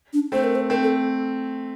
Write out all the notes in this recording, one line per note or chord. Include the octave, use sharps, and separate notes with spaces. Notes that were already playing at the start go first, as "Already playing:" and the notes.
D4
A3 C4 C5
A#4
C5
A3 C4 A#4
A4